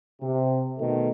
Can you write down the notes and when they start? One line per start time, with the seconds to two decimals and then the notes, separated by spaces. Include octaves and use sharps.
0.22 C3
0.79 B2 D#3 A3